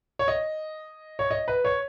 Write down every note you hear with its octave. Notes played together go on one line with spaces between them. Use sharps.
C#5
D#5
C#5
D#5
B4
C#5